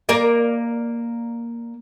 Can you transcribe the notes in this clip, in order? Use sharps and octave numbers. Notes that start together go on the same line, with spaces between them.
A#3 A#4 D5